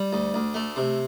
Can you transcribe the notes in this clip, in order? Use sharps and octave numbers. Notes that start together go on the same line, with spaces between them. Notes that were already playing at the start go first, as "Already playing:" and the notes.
Already playing: G3
D2
D2
A3
C3